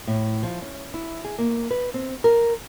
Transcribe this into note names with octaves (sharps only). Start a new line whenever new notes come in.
A2
F3
C#4
E4
G#4
A#3
B4
C4
A#4